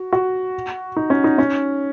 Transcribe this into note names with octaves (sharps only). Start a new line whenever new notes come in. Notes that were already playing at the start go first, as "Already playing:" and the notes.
Already playing: F#4
F#4
D#4
C#4
D#4
C#4